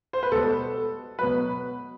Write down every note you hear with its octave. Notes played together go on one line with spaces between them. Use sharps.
C5
B4
B2 G3 A4
B2 F#3 B4